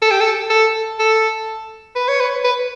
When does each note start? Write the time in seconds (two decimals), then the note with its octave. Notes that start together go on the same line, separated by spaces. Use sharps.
0.02 A4
0.11 G4
0.20 A4
0.50 A4
0.99 A4
1.95 B4
2.08 C#5
2.20 B4
2.44 B4